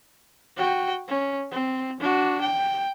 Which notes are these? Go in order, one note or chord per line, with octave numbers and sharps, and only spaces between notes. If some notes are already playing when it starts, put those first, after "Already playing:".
F#4 G5
C#4
C4
D4 F#4
G5